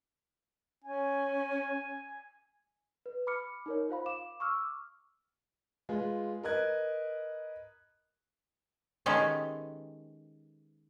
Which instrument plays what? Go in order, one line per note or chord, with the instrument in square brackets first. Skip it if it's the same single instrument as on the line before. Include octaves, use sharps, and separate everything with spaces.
[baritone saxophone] C#4 [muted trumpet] G#5
[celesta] B4
B5 D6 F6 C#7
D#4 A#4 C#5
F4 C5 F5 B5
F5 D6 E7
C#6 D6 E6 F6
[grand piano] G#3 F4 B4
A#4 B4 D#5 F#6 G#6
[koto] D#3 G#3 B3 C#4 G4 A4